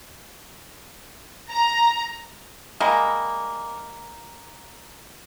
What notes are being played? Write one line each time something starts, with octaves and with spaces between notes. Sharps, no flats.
A#5
G3 G#3 A#3